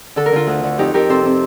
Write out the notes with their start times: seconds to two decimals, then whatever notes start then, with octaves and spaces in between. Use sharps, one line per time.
0.16 D3 A4
0.26 A#4
0.32 D3 F4 A4
0.47 D2
0.64 D3
0.78 F2 D#4 G4
0.94 F2 G4 A#4
1.09 C3 A4 C5
1.25 C3